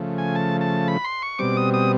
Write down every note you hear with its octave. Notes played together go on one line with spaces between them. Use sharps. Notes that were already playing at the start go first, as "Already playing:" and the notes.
Already playing: C#3 F3 A3
G#5
A5
A5
B5
C6
C#6
B2 G3 C4 D6
D#6
D#6